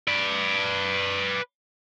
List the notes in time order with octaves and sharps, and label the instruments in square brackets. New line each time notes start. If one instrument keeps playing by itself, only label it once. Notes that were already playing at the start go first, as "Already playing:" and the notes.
[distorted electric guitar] B4 D5